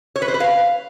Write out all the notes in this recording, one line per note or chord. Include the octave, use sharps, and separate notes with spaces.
C#5
B4
C5
B4
F5